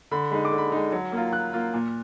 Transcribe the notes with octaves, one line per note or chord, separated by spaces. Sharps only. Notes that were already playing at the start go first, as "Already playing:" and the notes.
D3 B5
G#3 D#4 B5
D6
D3
B5
G#3 D#4
F#3
A#3 F4
F#3 F#6
A#3 F4
A#2